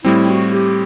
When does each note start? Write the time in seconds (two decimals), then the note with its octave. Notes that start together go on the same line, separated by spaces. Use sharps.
0.04 A2 G3 C4 E4
0.29 F#4
0.53 G4